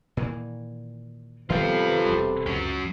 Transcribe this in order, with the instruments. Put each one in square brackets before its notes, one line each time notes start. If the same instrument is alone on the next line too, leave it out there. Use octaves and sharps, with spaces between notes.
[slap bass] A#2 D#3 E3
[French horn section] C3 A4 B4 [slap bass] D#3 G3 B3 [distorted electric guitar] F4 G5
[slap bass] E1 E2 G3
[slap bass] C#2 [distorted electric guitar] F#3 C#4